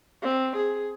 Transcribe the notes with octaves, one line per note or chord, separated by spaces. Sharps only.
C4
G#4